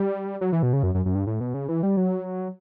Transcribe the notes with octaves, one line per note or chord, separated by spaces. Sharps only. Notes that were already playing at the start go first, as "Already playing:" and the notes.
Already playing: G3
F#3
E3
B2
C#3
F#2
F#2
F#2
G2
A2
B2
C#3
E3
G3
F#3